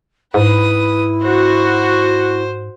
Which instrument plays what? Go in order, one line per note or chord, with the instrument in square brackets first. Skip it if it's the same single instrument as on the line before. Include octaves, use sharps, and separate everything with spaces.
[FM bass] G#2 [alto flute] E4 [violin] B4 D#6
[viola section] F#4 [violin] C5